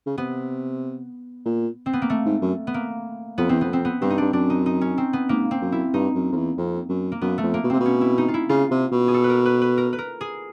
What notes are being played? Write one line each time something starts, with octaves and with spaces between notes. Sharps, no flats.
C#3
C3 B3
A#2
C4
B3
A#3
A3
G#2
F#2
B3
A#3
F2 B3
E2 C4
F2 B3
C4
B3
G2 C4
D#4
G2 D4
F#2 D4
D#4
D#4
C#4
C4
B3
G#2 A#3
C4
F#2
E4
G2 D#4
F#2
F2
E2
F2
F#2
A#3
F#2 B3
A3
F2
A#3
B2
C3 C4
B2
C#4
E4
D#4
F4
E4
C#3 F4
C3
B2
G#4
A4
B4
A#4
B4
B4
A#4
B4
A#4
G#4